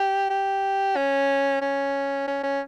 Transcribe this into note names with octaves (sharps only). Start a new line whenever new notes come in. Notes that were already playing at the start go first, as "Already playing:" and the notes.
Already playing: G4
G4
C#4
C#4
C#4
C#4